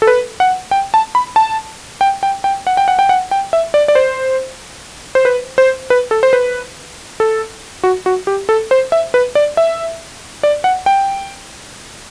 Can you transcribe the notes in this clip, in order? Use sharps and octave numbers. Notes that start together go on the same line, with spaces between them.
A4
B4
F#5
G5
A5
B5
A5
G5
G5
G5
F#5
G5
F#5
G5
F#5
G5
E5
D5
D5
C5
C5
B4
C5
B4
A4
C5
B4
A4
F#4
F#4
G4
A4
C5
E5
B4
D5
E5
D5
F#5
G5